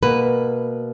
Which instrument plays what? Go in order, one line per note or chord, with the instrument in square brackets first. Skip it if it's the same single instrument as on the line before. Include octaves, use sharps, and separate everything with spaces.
[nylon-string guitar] B2 A#3 B4